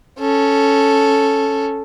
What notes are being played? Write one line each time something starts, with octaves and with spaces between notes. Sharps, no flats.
C#4 A4